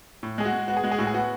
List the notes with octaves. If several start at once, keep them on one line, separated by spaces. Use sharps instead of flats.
A2
G#3 G#4
F#4
G#3
B3 F#4
G#4
G#3 F#4
G#4
A2 F#4
G#4
B3 F#4